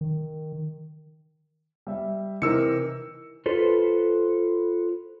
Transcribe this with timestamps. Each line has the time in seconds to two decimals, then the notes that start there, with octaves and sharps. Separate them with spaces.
0.01 D#3
1.87 G3 E5
2.42 C3 E3 D#4 A#4 E6 C#7
3.46 F4 A4 B4 C5